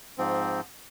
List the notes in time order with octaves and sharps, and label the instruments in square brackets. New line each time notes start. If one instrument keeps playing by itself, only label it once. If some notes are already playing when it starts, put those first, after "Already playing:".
[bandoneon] G#2 F3 C4